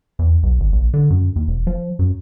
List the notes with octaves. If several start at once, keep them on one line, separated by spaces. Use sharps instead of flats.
E2
B1
G#1
A#1
D3
F#2
D#2
E1
F3
F#2